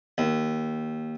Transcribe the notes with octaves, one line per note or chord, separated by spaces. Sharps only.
D#2